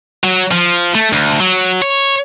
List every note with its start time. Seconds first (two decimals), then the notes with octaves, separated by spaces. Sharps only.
0.24 F#3
0.51 F3
0.95 A3
1.13 D2
1.40 F#3
1.82 C#5